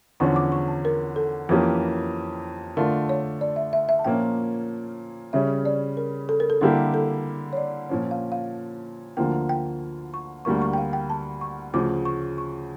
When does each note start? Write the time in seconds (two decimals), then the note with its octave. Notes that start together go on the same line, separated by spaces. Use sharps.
0.20 E2 D3 F3 C#4 C#6
0.36 D6
0.52 C#6
0.68 A5
0.85 A#4
1.16 A4
1.49 F2 E3 A#3 C#4 G4
2.77 D3 A3 D4 F4 A#4
3.09 C#5
3.41 D5
3.56 E5
3.73 E5
3.89 E5
3.99 A5
4.05 A#2 F3 A#3 C#4 G5
5.33 C#3 G3 C#4 E5
5.65 D5
5.97 A#4
6.29 A4
6.40 A#4
6.50 A4
6.61 D3 G3 A#3 E4 G4 A#4
6.94 A4
7.53 C#5
7.57 D5
7.89 A#2 F3 C#4
8.11 F5
8.32 F5
9.17 D2 D3 F3 A#3 G5
9.49 G5
10.14 C#6
10.45 D2 D3 G3 A#3 C#6
10.62 C#6
10.74 G5
10.78 F5
10.93 G5
11.10 A5
11.41 C#6
11.74 D2 C#3 F3 D6
12.05 C#6
12.38 C#6